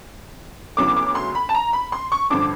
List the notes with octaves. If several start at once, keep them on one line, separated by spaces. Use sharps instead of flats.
D2 C#3 F#3 B3 E4 D6
D6
C6
B5
A5
A#5
B5
C6
C#6
A1 G2 D3 F3 D6